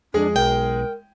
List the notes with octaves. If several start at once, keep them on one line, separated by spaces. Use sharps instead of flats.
F2 G#3 D4 G#4
B1 A#4 G5